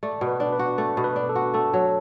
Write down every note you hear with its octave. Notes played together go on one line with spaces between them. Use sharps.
A3 D5
B2
B4
D4
B4
F#4
A3 A4
B2
B4
D4
A4
F#4
A3 A4
F#3